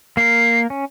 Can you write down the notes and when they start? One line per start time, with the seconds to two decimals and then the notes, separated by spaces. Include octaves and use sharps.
0.17 A#3 A#4 C7
0.70 C#4